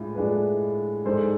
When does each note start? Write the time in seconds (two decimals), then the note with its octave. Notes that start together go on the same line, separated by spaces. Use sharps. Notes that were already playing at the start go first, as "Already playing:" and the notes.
Already playing: A2 G#3 D4 F4
0.15 A2 G#3 D4 F4 B4
1.05 G#2 G#3 D4 A4 C5